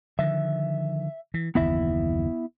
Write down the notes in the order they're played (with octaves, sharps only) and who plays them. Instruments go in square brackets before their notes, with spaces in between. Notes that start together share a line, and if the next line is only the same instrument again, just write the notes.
[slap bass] D3 D#3 F3 [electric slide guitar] E5
[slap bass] E3
[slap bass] F#1 D#2 E3 [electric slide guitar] B3 E4 E5